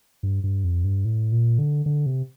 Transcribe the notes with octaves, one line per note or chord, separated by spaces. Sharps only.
G2
G2
F2
G2
A2
A#2
D3
D3
C3